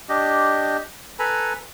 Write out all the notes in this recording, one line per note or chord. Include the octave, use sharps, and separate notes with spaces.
D4 G4 D#5
A4 B4 G#5 A#5 B5